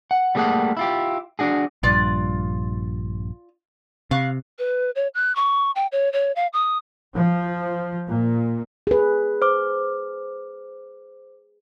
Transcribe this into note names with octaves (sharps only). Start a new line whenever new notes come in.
F#5
G3 A3 A#3 G#4 A4 F#5
E4 F4 G4
D4 F#4 G#4
A#1 G2 F4 D5 F#6
C3 F5 C#6 F#6
B4
C#5
F#6
C#6
G5
C#5
C#5
F5
D#6
F3
A#2
G#4 B4
C5 D6